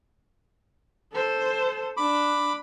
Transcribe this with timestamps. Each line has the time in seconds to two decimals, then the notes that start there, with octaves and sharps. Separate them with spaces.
1.13 A4 C5
1.97 D4 B5 D6